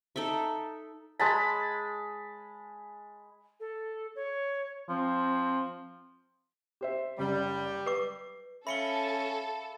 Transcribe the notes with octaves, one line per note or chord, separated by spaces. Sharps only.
D#4 A4 D5 E5
G#3 A5 B5
A4
C#5
F3 C4
G4 C5 E5
F#1 G3
B4 D6 C7
C#4 A4 E5 F5 B5 C#7 G7